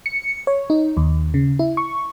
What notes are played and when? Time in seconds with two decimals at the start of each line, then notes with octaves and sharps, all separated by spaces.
0.06 C#7
0.47 C#5
0.70 D#4
0.97 D#2
1.34 C#3
1.59 E4
1.77 C#6